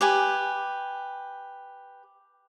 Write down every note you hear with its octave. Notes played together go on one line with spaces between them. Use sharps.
G4 B4 G#5